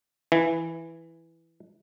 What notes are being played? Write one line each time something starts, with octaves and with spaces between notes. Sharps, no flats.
E3